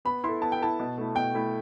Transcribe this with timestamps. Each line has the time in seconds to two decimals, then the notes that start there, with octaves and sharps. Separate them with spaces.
0.05 B3 B5
0.24 E4 A4 C6
0.42 B3 A5
0.52 G5
0.61 E4 A4 A5
0.79 B2
0.98 A3 E4
1.15 B2 G5
1.35 A3 E4